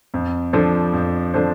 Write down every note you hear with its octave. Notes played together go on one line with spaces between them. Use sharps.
F2
F3 D4 A4 C5
F2
F3 D4 A4 C5